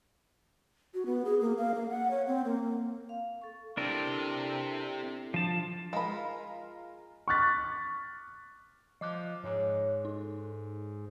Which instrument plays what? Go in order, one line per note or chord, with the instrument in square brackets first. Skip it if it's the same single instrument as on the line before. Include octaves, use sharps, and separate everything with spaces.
[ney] F#4
B3
G#4
A#3
F5
A#3
F#5
C#5
C4
A#3
[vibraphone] F5
A4 C#6
[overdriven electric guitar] C3 [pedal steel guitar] D4 A#4 [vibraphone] E4 A4
[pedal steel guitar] F3 A5 [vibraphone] D4
[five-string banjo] G#3 B5 [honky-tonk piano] F4 A#4
[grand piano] C#6 D6 F6 F#6 A6 B6
[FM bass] F3 [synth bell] D#5 D6 F#6
[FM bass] G#2 [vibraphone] C#5
[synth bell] D#4 [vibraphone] A4